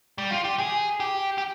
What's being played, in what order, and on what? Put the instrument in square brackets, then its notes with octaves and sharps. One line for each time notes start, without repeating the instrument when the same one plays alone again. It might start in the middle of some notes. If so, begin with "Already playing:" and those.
[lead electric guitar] G3
F4
G4
G#4
G4
G4